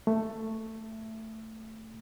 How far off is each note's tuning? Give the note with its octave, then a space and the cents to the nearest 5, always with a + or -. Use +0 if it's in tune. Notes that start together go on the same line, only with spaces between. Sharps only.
A3 +10